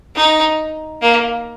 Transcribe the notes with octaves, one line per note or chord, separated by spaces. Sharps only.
D#4
A#3